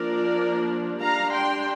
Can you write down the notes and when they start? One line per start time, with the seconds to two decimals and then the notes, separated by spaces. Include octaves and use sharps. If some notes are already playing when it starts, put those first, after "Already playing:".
Already playing: F3 A#3 D4 A#4 D5
1.00 G3 D4 F5 A#5
1.32 G5 C6